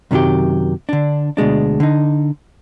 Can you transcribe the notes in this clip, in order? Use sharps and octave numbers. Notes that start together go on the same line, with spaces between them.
F#2 C3 D#3 F3 F#3 G4
D3 D4
D2 B2 G#3 D4
D3 D#4